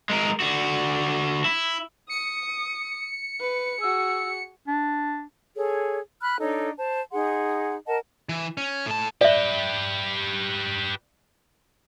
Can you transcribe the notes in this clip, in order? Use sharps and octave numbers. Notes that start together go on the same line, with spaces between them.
G#3 A#4
D3 F#4
E4
D#6 C#7
B4
F#4 G#4 E6
D4
G#4 A4 C#5
B5 F6 F#6
D4 D#4 A4 C#5
C5 A5
D#4 G#4 F#5 C6
A#4 D#5 F#5 A5
E3
C#4
A2 A5
G4 B4 D5 E5